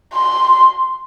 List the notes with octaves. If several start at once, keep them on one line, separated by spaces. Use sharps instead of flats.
C6